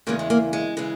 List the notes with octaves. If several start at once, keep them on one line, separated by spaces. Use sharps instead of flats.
E2 C#3 E3 G#3 A#3
G#3
A#3
G#3
C#3 E3 G#3